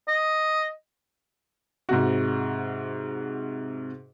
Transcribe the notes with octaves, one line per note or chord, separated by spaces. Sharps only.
D#5
G#2 C3 F#4